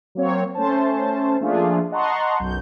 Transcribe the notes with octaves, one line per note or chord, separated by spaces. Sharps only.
F#3 A#3 C4 C#5
A3 C#4 C5 A5
F3 A3 A#3 D4 F4 G#4
D#5 F#5 A5 A#5 C6 C#6
B1 F#2 G6